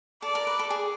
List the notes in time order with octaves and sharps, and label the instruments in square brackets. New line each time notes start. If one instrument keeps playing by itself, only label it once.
[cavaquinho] A4 [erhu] D5
[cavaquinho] A#4
B4
A4
G#4